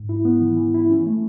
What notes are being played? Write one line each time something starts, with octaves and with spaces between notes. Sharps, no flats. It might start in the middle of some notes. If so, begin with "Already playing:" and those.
Already playing: G#2
E4
B3
E3
E3
E4
C#4
A3